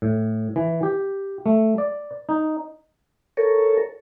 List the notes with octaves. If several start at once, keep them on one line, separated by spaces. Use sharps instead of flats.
A2
E3
G4
A3
D5
D#4
A4 A#4 C#5